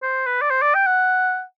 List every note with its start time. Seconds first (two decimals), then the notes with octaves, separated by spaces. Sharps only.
0.03 C5
0.26 B4
0.42 D5
0.51 C5
0.62 D5
0.75 G5
0.87 F#5